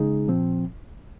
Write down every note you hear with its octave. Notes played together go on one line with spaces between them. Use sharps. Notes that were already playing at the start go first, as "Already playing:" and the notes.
Already playing: C#3 G#3 D#4 G#4
A#2 F3 C4